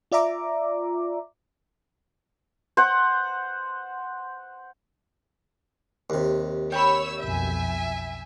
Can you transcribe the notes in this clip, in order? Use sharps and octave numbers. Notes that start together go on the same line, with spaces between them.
F4 D5 E5 A#5 D6
C5 F#5
D#2 C3
C#5 G5 B5 E6
B1 F2 B2 E5 G#5